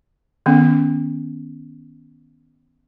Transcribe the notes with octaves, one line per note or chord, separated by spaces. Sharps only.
D#3 B3 C#4